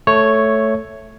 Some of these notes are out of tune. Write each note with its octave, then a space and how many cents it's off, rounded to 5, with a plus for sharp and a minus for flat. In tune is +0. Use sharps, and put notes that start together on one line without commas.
A3 +0 C#5 +0